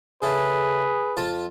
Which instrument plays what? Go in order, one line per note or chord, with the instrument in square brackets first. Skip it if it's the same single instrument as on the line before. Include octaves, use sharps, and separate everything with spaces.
[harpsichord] C#3 E4 A4 [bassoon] G#4 [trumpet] B4
[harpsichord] F2 F4 A5